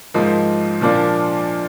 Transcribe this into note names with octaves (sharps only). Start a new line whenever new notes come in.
G#2 F3 A#3 D#4
A#2 F3 A#3 D4